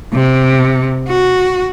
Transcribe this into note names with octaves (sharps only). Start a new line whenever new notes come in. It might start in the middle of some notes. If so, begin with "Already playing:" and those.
C3
F#4